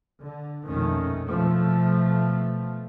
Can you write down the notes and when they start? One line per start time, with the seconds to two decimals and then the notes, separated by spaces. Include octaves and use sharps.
0.22 D3
0.67 A#1 F2 B2 D#3 A3 C#4
1.27 B2 F3 A3